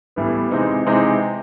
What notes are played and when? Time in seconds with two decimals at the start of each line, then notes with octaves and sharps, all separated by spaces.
0.16 A2 E3 G3 B3 E4
0.51 C3 E3 G#3 C4 D#4
0.86 C3 E3 G#3 C4 D#4